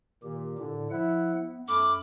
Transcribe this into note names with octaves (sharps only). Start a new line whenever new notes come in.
A#2 D#3 G4
A2 D3
F3 E4 F#5 F#6
B3
F#2 A3 B5 D6 F6